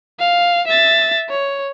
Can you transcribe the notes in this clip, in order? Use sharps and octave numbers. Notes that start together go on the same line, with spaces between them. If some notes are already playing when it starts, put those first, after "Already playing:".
F5
E5 A6
C#5